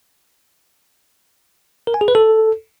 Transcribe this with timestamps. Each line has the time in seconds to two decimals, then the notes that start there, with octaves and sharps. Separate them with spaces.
1.87 A#4
1.94 G#5
2.01 G#4
2.08 B4
2.15 A4